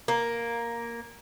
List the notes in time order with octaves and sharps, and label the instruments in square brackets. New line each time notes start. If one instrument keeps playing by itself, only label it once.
[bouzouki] A#3